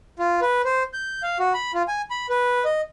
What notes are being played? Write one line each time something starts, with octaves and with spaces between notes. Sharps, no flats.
F4
B4
C5
G6
F5
F#4
B5
F4
G#5
B5
B4
D#5